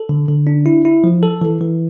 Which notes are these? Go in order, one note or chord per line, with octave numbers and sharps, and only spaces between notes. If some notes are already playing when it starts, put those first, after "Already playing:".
Already playing: A4
D3
D3
D4
E4
E4
F3
A4
E3
E3